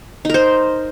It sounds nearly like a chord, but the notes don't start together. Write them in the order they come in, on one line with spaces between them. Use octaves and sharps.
D#4 A#4 C5